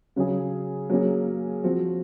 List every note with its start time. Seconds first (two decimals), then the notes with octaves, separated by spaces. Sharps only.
0.16 C#3 F#3 C#4 G#4
0.90 F#3 A#3 C#4 G#4
1.64 F3 C4 F#4